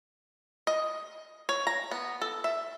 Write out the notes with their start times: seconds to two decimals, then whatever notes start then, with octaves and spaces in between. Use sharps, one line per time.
0.67 D#5
1.49 C#5
1.67 A#5
1.91 B3
2.22 A4
2.44 E5